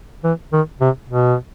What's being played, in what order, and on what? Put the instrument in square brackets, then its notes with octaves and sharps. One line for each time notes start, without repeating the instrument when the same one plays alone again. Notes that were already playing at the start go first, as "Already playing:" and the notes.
[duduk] E3
D#3
C3
B2